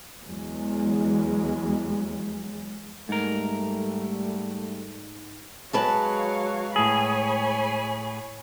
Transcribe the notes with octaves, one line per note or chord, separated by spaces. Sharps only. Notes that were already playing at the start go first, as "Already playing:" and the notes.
E2 F#3 G#3
G#2 G3 A3 A#4
F#3 G#3 B4 C#5 F5 A5
A2 G#4 C#5 G#5 B5